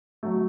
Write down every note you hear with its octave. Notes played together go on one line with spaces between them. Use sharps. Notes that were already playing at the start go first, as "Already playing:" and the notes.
F#3 A3